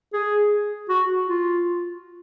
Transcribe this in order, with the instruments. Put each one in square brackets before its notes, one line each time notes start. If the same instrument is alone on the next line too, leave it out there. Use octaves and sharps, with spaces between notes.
[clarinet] G#4
F#4
F4